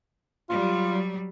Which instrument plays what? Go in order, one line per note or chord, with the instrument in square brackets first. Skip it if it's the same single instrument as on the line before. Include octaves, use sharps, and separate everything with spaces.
[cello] F#3 G3 [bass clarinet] F4